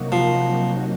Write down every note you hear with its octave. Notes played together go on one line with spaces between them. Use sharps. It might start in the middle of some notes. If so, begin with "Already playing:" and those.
Already playing: C3 F#3 A#3 D#4 F#4
F3